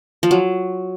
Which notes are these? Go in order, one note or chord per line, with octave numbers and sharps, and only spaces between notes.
F3
F#3